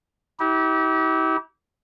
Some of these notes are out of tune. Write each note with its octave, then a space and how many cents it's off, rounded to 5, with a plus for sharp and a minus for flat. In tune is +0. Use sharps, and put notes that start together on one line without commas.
E4 -45 G4 -25